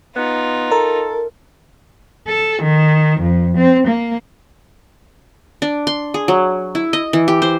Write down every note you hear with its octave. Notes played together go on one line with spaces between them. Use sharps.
B3 D#4 F4
A4 A#4
A4
D#3
F2
C4
A#3
D4
C6
G#4
F#3
E4
D#5
E3
G4
C5